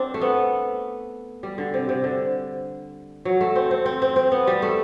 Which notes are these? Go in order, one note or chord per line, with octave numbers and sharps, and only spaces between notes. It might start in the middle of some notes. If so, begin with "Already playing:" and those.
Already playing: C4 D4
A3
B3
G3
D3
C3
C3
D3
F#3
A3
C4
C4
C4
C4
C4
B3
G3
A3